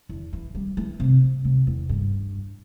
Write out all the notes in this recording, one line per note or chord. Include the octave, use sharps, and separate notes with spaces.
E2
E3
G3
E3
C3
C3
E2
G2